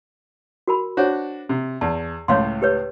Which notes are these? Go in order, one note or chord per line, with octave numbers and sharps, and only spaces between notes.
F#4 A#4 B5
D4 F#4 C5 C#5
C3
E2 A5
C#2 A2 C#5 F5 C6
G4 B4 C#5